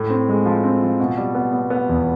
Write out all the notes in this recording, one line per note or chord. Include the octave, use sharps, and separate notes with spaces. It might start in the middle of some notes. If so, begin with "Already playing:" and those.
Already playing: A2
C4
G#3
F3
C4
F3
B2
G3
B3
B3
B3
E2